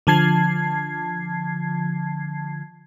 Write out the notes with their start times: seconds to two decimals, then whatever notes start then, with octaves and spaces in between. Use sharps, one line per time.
0.07 D3 F3 A5 G#6 C7